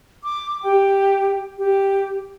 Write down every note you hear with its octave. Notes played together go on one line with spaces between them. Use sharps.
D6
G4 G5
G4